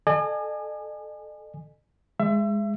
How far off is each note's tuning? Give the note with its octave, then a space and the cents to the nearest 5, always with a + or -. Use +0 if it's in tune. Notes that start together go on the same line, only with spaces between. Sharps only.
A4 -15 D#5 -45 G#5 +0
G#3 -5 E5 +30